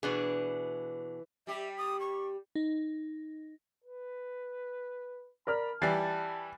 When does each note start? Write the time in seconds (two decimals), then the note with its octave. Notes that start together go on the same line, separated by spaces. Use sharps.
0.03 B2 E3 D4 G#4
1.47 G3 G4 E5
1.78 D#6
2.00 C#6
2.55 D#4
3.84 B4
5.47 A#4 D5 B5 F6
5.82 E3 G3 A5 F#6 A6 C7